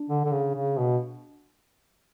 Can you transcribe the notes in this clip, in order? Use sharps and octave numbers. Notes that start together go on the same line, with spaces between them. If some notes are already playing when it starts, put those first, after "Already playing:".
Already playing: D4
D3
D3
C#3
C#3
B2